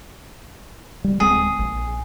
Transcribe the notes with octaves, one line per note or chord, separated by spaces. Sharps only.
G3
D1 G#3 C4 G#4
A#1